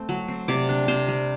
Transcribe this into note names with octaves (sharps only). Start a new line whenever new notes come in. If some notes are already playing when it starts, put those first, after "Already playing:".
Already playing: A3 C4
F#3
C4
C3 D5
D4
C3 C5
G3